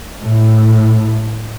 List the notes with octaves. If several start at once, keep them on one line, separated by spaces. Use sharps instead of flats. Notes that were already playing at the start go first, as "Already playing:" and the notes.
A2